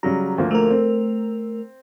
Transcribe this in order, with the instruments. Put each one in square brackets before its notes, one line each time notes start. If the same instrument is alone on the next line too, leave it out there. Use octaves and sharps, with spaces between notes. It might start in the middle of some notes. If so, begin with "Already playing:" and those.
[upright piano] C#3 F#3 G3 [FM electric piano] A#5
[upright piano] D2 F3 A#3
[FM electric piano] A3 A#4
[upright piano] C4